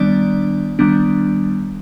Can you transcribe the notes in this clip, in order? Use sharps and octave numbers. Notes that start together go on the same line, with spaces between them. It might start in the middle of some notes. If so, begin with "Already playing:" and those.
Already playing: D#3 G3 B3 D4 D5
D#3 G3 B3 D4